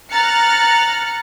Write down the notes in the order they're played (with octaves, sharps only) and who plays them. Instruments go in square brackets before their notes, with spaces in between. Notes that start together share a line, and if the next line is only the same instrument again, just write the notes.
[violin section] A#5 F6 F#6 A6 C#7